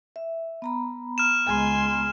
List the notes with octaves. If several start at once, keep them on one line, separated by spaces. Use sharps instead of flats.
E5
B3 A#5 B5
F6 E7
C#2 G#3 G#5 C6